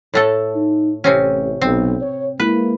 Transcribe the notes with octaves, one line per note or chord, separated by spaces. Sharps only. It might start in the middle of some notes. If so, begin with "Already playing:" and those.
A2 A3 A4
D#4
A1 C3 C4 C#4
B1 C4
C#5
G#3 A#3 E4 B4